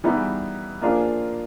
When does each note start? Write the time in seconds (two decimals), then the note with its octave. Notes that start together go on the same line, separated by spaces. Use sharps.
0.04 E3 G3 B3 D#4 G#4
0.81 F3 A#3 D4 F4 G#4